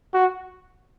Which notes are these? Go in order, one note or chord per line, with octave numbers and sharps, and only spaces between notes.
F#4